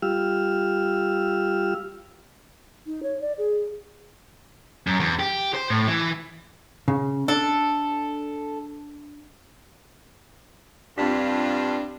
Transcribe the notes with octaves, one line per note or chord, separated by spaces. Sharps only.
G3 F4 G4 E6 F6
D#4
C#5
D5
G#4
F#2
E2
G4
C5
A2
E3
C#3
D4 A4
G2 C4 D4 F4 B6